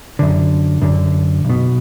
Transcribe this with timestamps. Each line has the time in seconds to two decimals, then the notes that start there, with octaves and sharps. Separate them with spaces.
0.19 F#2 D3
0.82 F#2 D3
1.45 B1 B2